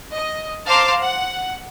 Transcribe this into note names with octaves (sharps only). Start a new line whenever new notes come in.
D#5
C5 F5 A5 A#5 C6 D6
F#5